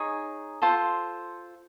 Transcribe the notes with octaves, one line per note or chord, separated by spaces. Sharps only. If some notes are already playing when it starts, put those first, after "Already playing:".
Already playing: D#4 G#4 C#5
F4 A4 C5